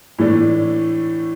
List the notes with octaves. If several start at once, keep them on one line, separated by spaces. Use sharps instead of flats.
A2 E3 A3 D4